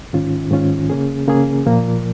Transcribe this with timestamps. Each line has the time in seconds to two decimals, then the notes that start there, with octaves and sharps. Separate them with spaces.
0.13 G#2 D#3 C#4 F4
0.51 G#2 D#3 C#4 F4
0.90 C#3 A#3 C#4 G#4
1.28 C#3 A#3 C#4 G#4
1.66 A#2 F3 A#3